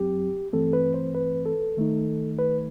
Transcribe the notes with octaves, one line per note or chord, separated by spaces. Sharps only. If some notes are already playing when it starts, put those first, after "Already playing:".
Already playing: F#2 F#3 C4 G4
G2 E3 A3 C4 A4
B4
C5
B4
A4
D#3 A3 D#4
B4